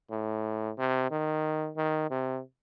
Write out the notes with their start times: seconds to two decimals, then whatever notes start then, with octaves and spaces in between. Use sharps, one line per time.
0.11 A2
0.78 C3
1.11 D#3
1.77 D#3
2.10 C3